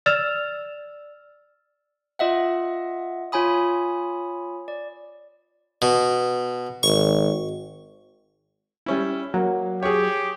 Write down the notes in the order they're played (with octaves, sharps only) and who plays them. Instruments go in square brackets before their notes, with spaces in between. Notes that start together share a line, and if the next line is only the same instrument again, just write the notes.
[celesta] D5 E6 F6 A6 E7 F7
[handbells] F4 D#5 E5 F#5
F4 C#5 G#5 B5 D#6
D5
[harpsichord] B2
[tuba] G#1 [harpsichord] C#6
[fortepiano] G3 C#4 E4
[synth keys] F#3 [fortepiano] A#3
[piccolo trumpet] G4 [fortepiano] G#4 C#5